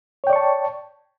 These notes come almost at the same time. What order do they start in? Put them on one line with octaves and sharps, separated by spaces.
C#5 G5 D5 C#6 A5